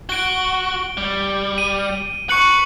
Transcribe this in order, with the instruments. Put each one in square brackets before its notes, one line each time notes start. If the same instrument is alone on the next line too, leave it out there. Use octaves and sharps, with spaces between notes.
[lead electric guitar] F#4 [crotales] D7 G7
[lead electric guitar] G3
[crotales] D#7
[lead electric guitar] B4 [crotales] C#6 C#7 F#7